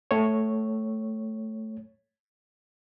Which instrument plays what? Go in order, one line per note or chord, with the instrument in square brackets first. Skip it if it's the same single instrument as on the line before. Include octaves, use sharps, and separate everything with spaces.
[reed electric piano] A3 C#5